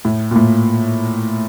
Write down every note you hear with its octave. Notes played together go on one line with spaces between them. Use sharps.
A2
A#2
A2